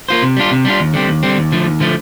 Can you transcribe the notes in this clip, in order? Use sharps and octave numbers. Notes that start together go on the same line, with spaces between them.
A#3 F4 C5
C3
G3 D4 F4
C3
G3 D4 F4
D#2
D3 G3 C4
D#2
D3 G3 C4
D#2
D3 F3 A3
D#2
D3 F3 A3